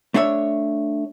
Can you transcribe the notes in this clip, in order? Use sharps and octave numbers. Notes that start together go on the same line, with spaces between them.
A3 D4 C#5 E5